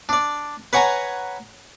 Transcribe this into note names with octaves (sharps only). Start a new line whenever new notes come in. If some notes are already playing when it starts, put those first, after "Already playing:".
D4 D5
B4 C#5 F#5 G#5 A#5